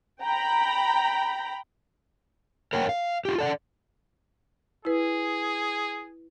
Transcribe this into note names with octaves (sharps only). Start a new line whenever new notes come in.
G5 A#5 B5
A#4 C#5 F#5 G5
F5
F4 G4
A4 D5 F#5
E4 G#4 B4